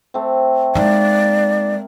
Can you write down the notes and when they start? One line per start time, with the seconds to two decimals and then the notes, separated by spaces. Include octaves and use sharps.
0.14 A3 C4
0.75 G#3 A#3 D#4 D5